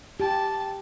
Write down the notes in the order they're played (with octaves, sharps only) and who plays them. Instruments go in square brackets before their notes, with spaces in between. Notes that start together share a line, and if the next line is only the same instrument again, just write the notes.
[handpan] G4 [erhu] A5